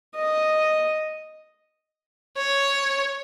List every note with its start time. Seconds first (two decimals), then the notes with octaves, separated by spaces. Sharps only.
0.16 D#5
2.37 C#5